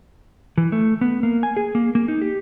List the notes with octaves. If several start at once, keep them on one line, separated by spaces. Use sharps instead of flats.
E3
A3
B3
A#3
G#5
G#4
A#3
A#3
D#4
G4